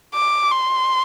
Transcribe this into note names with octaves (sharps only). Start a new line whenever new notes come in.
D6
C6